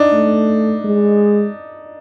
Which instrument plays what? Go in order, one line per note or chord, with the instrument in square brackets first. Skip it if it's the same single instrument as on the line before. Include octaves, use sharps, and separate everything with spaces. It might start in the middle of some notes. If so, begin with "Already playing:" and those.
Already playing: [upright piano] D4 D#4
[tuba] A3
G#3